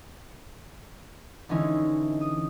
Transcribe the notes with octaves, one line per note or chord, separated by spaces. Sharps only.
D3 E3 G#3 C#4 D#4 E4
D#6